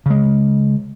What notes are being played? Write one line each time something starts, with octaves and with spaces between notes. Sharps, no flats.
C#3 G#3